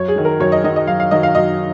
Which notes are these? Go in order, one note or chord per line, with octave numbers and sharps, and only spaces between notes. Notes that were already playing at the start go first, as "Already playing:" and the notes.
Already playing: F#2 C#5
G#4
D#3 F#3
A#4
F#2 C#5
D#5
D#3 F#3 D#5
D#5
F#2 F5
F5
D#3 F#3 D#5
F5
F#2 D#5